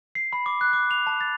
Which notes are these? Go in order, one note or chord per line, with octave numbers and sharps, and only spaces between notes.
C7
B5
D6
F#6
D6
F7
A5
A6